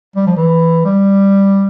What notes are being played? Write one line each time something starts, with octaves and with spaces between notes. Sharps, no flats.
G3
F3
E3
G3